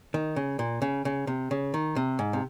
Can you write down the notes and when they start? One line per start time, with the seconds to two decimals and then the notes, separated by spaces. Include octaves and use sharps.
0.14 D#3
0.36 C#3
0.59 A#2
0.82 C#3
1.05 C#3
1.27 C3
1.51 C#3
1.74 D#3
1.96 C3
2.19 G#2
2.33 C3